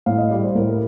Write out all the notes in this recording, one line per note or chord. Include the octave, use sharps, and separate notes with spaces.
A2 F5
D#5
G3 D5
C5
A2 A#4